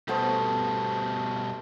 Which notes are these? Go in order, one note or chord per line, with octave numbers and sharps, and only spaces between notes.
B2 G3 A3 B3 C5 A5